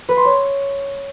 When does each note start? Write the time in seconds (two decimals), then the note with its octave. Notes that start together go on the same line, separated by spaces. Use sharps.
0.09 B4
0.17 C6
0.25 C#5